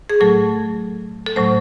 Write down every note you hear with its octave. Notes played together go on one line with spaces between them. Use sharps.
G#4
A2 F#3 A3 A4
A4
A2 F#3 A3 C5